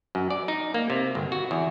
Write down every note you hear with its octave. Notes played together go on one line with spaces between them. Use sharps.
F#2
D5
D#4
A#3
C3
G1
F#4
E2